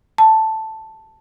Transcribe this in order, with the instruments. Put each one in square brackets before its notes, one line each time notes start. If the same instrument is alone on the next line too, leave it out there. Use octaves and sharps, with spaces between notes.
[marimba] A5